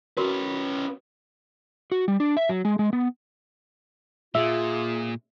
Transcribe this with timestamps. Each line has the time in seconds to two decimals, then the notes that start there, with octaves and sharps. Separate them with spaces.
0.17 C#4 F#4 A#4 B4
1.92 F#4
2.08 G3
2.20 D4
2.37 E5
2.49 F#3
2.65 G#3
2.79 G#3
2.93 B3
4.35 A#2 F4 G#4 E5